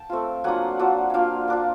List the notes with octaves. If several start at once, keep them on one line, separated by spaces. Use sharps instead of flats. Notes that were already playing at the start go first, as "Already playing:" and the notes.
Already playing: G5 A5
A3 C4 F4
F#3 A#3 D4 F4 F#5 G#5
F#3 A#3 D4 F4
A#3 D4 F4 F5 G5 G#5
A#3 D4 F4